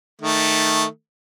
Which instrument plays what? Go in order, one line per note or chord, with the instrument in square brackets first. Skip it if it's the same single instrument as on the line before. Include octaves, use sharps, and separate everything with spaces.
[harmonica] D#3 A3